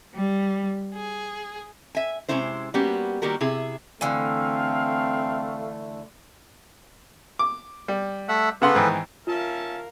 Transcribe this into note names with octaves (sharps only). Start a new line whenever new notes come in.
G3
G#4
E5 G#5
C3 F#3 G#3 C#4 E4 C5
G3 A#3 B3 C#4 F#4 G4
D#3 G3 A#3 F#4 G4 A#4
C3 E4 G#4
D3 E3 A3 C4 F5
D6
G3
A3 E5 F#5
C#3 B3 A4 B4 F#5 C6
G#2 D#3 E3
C#4 F4 A#4 E5 F5 A5